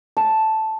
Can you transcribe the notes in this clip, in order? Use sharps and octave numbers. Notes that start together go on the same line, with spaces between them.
A5